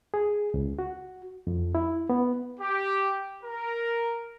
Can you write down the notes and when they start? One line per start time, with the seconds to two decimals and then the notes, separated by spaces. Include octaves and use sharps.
0.14 G#4
0.54 C#2
0.79 F#4
1.47 F2
1.75 E4
2.10 B3
2.60 G4
3.44 A#4